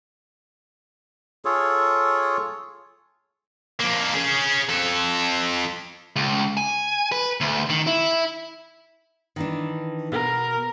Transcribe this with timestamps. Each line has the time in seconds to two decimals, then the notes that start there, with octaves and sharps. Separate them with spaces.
1.45 F4 G#4 A4 C#5
3.79 F2 A#3
4.14 C#4 G#4
4.69 F2 A4
6.16 C#2
6.57 G#5
7.12 B4
7.41 D2
7.70 D#3
7.87 E4
9.36 D#3 E3 D4
10.12 B2 A#4